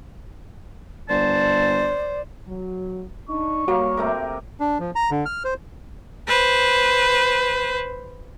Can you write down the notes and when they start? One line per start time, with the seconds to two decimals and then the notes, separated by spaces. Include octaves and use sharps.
1.09 G1 C5 D5 A5
2.47 F#3
3.29 D4 D#4 C#6
3.68 G3 A#3 F#4 A#4 C#5
3.97 C3 A3 A#4
4.60 D4
4.80 F3
4.95 A#5
5.11 D3
5.26 F6
5.44 C5
6.27 B4 C5